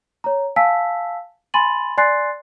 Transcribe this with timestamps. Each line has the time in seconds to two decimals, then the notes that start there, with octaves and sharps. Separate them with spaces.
0.24 C#5 A#5
0.56 F5 G#5 A5 E6 B6
1.54 G#5 B5 C6 A6 D#7 F#7
1.98 D5 G#5 C6 F#6 A6 C7